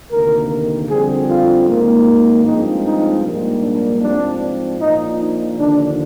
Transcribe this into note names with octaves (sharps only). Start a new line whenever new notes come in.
D2 C3 D#3 A#3 A#4
F2 D3 G3 C4 G#4
F4
G#1 G#2 D#3 A#3
G2 F3 G#3 C4 D#4
D#4
A#1 G#2 G3 A#3
D4
G#2 F3 C4 D4
A#1 A#2 F3 D#4
D#4
D#2 D3 F3 D4